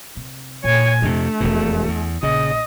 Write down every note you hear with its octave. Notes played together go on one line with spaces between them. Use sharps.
C3
F2 A#2 C#5 G#5
F2 C3 A3 D4
E1 F2 B2
E2
A#1 C#3 D#5